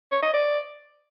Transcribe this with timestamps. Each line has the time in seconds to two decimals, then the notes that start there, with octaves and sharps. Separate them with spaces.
0.12 C#5
0.23 D#5
0.34 D5